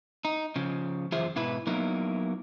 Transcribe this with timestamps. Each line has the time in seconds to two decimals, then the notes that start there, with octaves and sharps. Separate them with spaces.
0.25 D#4
0.56 C#3 F3
1.12 F#2 E3 F4 G#4 C5 E5
1.36 G#2 B2 E4 B4
1.67 F#3 A#3 B3 D#4 E4